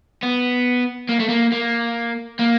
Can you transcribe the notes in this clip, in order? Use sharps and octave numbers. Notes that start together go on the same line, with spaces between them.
B3
A#3
A3
A#3
A#3
A#3